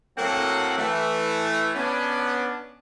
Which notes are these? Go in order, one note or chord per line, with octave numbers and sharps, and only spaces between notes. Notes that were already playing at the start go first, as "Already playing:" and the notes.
A2 F#3 A#3 C4 A4 F#5
E3 A3
B3 C#4 D4